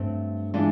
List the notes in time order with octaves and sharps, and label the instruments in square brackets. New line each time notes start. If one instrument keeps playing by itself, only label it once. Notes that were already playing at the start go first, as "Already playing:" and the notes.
Already playing: [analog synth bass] G2 [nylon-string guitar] F#3 A3 C4
[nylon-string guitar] E3 G#3 B3 D4 F4